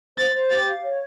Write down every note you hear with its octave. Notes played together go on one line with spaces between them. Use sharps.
C5 A6
C5
G4 A6
F5
C#5